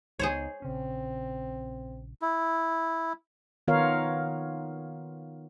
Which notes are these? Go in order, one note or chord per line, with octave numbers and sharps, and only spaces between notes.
C#2 G#3 B3 D#4 G#4 C5 C#5
A#1 C#3 C4 C#4
E4
D#3 B3 F4 A#4 C#5 F5